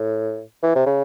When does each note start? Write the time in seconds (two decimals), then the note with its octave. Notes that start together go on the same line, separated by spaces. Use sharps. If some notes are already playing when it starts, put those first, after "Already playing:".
Already playing: A2
0.63 E3
0.75 C3
0.86 C#3